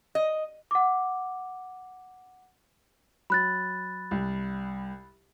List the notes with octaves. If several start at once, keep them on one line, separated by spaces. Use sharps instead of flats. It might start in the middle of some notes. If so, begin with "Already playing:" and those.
D#5
F#5 D6
F#3 B5 F#6 A6
C2